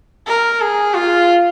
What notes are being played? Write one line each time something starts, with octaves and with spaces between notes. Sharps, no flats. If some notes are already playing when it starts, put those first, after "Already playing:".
A#4
G#4
F4